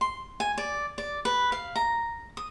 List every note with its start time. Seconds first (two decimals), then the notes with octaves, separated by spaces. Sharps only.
0.01 C6
0.40 G#5
0.58 D5
0.98 D5
1.25 B4
1.52 F5
1.76 A#5
2.37 D#6